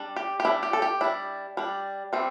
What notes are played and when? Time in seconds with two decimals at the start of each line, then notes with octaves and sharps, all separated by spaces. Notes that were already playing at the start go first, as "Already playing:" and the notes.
Already playing: G3 D4
0.16 G4
0.40 G4
0.45 G3 D4 E4
0.63 G4
0.73 A4
0.82 G4
1.01 G3 D4 E4
1.57 G3 D4
2.13 E3 G3 C4